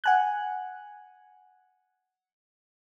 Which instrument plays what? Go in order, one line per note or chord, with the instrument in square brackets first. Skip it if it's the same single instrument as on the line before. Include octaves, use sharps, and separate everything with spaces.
[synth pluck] F#5 G#5 F#6